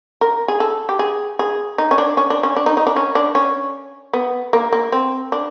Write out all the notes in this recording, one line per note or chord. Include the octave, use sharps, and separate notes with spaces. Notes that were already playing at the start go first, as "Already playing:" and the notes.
A#4
G#4
A4
G4
G#4
G#4
D#4
C#4
D4
C#4
D4
C#4
D4
D#4
D#4
D4
C#4
D4
C#4
B3
A#3
A#3
C4
D4